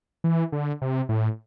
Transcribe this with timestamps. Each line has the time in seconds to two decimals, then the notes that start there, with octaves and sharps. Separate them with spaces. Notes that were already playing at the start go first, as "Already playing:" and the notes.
0.24 E3
0.52 D3
0.82 C3
1.09 A2